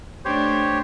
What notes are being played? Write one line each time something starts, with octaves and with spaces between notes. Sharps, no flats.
A3 D4 G4 C5 C#5